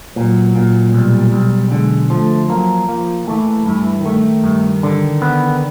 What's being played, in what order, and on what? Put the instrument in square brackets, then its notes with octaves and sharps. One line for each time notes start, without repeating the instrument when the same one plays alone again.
[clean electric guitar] A#2 [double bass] F#3
[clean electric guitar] A#2
[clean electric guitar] B1 [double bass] G3
[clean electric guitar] B1
[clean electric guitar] D3 [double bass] G#3
[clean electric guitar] F3 [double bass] A3
[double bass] F#3 [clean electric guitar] A#3
[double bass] F3 [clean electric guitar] A#3
[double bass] E3 [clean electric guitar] A3
[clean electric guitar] G2 [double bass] E3
[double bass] D#3 [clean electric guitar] A3
[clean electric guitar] G2
D3
B3